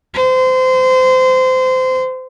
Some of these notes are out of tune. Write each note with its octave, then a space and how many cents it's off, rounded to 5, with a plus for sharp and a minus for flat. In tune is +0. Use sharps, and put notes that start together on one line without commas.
C5 -25